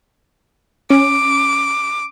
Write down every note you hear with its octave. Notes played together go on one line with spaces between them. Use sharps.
C#4 D6